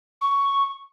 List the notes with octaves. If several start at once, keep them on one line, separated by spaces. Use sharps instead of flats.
C#6